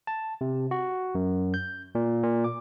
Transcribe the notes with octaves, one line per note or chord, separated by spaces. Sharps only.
A5
C3
F#4
F#2
G6
A#2
A#2
D6